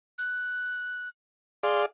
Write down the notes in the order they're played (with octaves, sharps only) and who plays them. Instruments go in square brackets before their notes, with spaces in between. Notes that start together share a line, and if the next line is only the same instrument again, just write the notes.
[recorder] F#6
[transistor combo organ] G#4 D5 F5 [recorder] C6